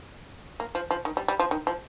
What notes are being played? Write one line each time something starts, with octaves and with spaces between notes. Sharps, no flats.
A#3
F3
F3
D#3
G3
G3
F3
D#3
F3